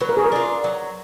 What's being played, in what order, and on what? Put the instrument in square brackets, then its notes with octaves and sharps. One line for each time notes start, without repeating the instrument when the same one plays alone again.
[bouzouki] F#3 [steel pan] B4
[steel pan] A#4
G#4
A#4
[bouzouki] D4 F4
F#3